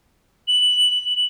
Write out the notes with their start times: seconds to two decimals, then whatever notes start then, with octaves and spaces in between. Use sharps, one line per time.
0.48 F#7